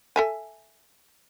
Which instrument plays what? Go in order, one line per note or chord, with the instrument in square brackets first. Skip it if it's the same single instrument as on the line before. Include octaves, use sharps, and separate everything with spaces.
[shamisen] A4 E5 G#5